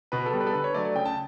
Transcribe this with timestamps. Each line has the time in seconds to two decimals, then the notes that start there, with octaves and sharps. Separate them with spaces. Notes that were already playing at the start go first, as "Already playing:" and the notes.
0.12 B2 B4
0.26 A4
0.33 G3 B3
0.40 B4
0.47 A4
0.54 D3 B4
0.64 C#5
0.74 F#3 A3 D5
0.85 D5
0.95 C#3 G5
1.05 A5